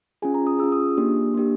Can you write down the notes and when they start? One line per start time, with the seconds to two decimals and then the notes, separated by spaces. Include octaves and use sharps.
0.22 C#4 F4 G#4 G#5
0.34 A#5
0.47 D#6
0.59 C#4 F4 G#4 E6
0.72 D#6
0.98 A#3 D4 G4
1.34 A#3 D4 G4